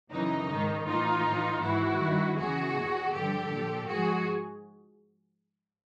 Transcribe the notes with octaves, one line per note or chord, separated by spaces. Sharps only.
F#2 C#3 E3 D#4
G#2 D#3
A2 E3 D#4 F4
A2 E3
G#2 E3 E4 F#4
G2 D#3
E2 C#3 E3 F#4 G#4
E2 B2
G2 D3 F3 G4 A4
A#2 F3
G#2 F3 F#4 G#4